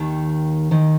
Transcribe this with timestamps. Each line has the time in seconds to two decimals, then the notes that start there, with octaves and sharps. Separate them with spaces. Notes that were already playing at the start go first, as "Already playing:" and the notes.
Already playing: D#2 D#3
0.71 D#2 D#3